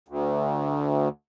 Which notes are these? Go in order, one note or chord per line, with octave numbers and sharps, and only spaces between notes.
D2